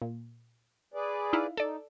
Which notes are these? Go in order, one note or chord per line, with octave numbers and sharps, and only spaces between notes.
A#2
G#4 B4 D5
D#4 E4 F5
D#4 A4 D5